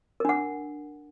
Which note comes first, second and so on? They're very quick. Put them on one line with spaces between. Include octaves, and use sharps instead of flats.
A#4 D4 F#5